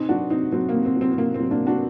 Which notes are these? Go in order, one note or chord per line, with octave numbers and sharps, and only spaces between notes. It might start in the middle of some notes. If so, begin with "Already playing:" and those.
Already playing: C3 C4 D#4
F#3 D4 F#4
C3 C4 D#4
F#3 C4
A#3
C3
C4
F#3
C4
C4
C3 A#3
C4
F#3
A#3 D4
C3
D4 F#4